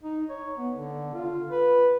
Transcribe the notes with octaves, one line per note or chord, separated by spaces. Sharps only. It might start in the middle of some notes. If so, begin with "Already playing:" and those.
D#4
C#5
B3
D3
F4
B4